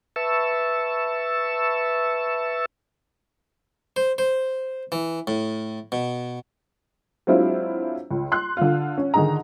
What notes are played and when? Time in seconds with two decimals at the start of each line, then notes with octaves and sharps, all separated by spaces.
0.16 B4 E5 A5 C#6 E6
3.96 C5
4.18 C5
4.92 E3
5.27 A2
5.92 B2
7.27 F#3 G#3 C4 D4 E4 F4
8.11 C#2
8.32 C6 F#6
8.57 D3 F4
8.98 C#4
9.14 D3 D#3 D#4 G#4 A#5